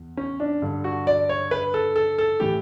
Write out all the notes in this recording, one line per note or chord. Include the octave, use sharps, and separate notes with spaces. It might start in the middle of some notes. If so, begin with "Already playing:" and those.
Already playing: E2
C#4
D4
G2 D3
F#4
D5
C#5
B4
A4
A4
A4
A2 E3 G4